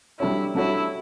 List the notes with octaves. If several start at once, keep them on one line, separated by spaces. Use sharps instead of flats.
G3 D4 E4 F#4 A4 C#5
G3 D4 E4 F#4 A4 C#5